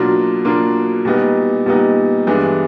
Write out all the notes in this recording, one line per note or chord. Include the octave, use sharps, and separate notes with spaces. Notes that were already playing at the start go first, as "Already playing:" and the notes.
Already playing: B2 F#3 A#3 D4 F4
B2 F#3 A#3 D4 F4
A#2 G3 B3 D#4
A#2 G3 B3 D#4
G2 E3 G#3 B3 D4